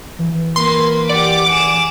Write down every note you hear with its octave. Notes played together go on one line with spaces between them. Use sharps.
E3
A#3 B4 C6
G4 D5 F#5 D6
G#4 E7